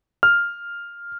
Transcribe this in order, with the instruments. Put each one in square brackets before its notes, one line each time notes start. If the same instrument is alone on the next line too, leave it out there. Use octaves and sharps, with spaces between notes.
[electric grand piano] F6